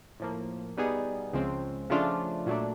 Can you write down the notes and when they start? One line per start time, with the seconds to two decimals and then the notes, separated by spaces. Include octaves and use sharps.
0.20 A2 F3 A#3
0.77 B2 G3 B3 D#4 G#4
1.33 C#2 C#3 F3 G#3 C4
1.90 C#3 F3 A3 D4 F4
2.46 A#2 F#3 A3 D4